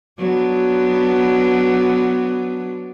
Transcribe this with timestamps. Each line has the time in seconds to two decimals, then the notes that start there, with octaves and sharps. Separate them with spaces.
0.18 F#3 B3 D4